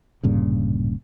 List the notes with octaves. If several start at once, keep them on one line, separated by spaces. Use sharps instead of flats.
D1 G2 A#2 C#3